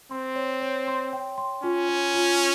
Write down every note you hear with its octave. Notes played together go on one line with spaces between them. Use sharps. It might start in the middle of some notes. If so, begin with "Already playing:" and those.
C4 C6
C#5
C#5
C6
G5
C6
C#4 F4
C#5
F4